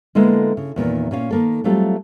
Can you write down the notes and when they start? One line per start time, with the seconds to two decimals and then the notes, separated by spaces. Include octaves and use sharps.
0.15 D3 G#3 A#3 B3 E4 A4
0.57 C#3
0.76 E2 A#2 D3 D#3
1.11 A#2 C#4 F5
1.30 D#3 A#3 A4
1.64 F#3 G3 A3 C4 F4